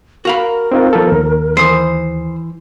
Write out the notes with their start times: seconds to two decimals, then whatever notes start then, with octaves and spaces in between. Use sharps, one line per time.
0.25 F#4 A#4 F5 B5
0.72 C4 D#4 F4
0.93 F3 B3 A4
1.12 D#2
1.57 E3 C5 D#6